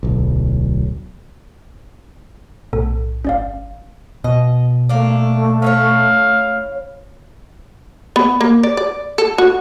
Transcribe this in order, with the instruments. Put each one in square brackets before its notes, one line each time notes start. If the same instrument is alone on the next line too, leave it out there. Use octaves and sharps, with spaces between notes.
[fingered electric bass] D1 B1
[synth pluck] B1 A2 [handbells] A4
[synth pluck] G1 [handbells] C#4 D5 F5
[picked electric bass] B2 [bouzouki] D#5
[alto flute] A3 [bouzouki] A#3 D4
[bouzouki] C#4 E4 C#5 [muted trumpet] F5
[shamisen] B3
A#3
D5
D5
A4
F#4